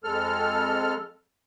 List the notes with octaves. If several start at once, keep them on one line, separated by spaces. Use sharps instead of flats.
F2 G#3 A4 F6